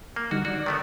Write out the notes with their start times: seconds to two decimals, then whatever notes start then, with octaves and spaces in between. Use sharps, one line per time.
0.16 A#3
0.31 D3 G3 D#4 F#4
0.45 F#4 D5
0.66 D#3 A3 B3